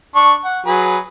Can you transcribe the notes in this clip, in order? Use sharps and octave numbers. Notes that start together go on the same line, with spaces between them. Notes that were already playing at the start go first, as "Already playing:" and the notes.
D4 C#6
F#5
F#3 G#4 B4